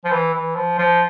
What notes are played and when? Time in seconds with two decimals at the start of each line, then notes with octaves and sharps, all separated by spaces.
0.05 F3
0.12 E3
0.34 E3
0.56 F3
0.79 F3